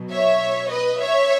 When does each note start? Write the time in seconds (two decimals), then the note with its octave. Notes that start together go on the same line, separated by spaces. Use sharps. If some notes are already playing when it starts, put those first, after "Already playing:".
Already playing: B2 F#3
0.11 C#5 E5
0.70 B4 D#5
1.00 C#5 E5